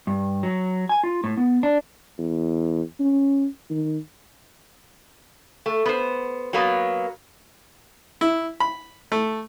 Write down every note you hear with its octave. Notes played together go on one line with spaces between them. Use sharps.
G2
F#3
G#5
F4
A2
B3
D4
E2
C#4
D#3
A3
B3 C5
F#3 A#3 B3
E4
B5
A3